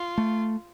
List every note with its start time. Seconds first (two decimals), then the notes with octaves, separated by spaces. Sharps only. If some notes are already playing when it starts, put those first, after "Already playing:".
Already playing: F4
0.18 A3